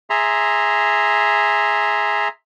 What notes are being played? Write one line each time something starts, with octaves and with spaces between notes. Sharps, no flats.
G#4 E5 A#5 C6